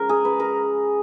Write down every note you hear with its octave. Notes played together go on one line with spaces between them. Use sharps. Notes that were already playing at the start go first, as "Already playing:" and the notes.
Already playing: C#3 F3 G#3 A#4
G#4
B4
A#4